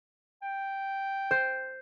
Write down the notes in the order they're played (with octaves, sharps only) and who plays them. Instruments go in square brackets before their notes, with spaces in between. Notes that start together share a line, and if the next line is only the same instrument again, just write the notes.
[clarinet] G5
[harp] C5